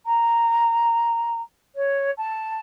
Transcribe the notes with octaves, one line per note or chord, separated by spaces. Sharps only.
A#5
C#5
A5